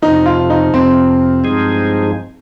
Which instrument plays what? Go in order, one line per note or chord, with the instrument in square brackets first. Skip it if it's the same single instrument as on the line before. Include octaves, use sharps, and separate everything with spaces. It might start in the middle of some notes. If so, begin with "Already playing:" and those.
[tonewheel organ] F2 C3 F3 [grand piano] D#4
[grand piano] F4
D#4
[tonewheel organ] F2 C3 F3 [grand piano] C4
[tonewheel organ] G2 F3 G#3 D#4 G#4